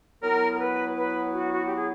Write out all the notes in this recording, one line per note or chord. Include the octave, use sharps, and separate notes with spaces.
F#3 B3 E4 A#4
A#4
B4
B4
F#4
F#4
G4
G#4